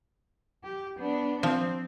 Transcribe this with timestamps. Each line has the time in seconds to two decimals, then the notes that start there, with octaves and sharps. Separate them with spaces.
0.64 G4
0.99 B3 D4
1.43 F3 C4